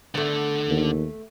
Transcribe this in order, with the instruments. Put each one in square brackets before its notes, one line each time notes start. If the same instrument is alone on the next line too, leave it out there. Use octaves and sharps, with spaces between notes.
[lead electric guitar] D3 [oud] A3 B3
[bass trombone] D#2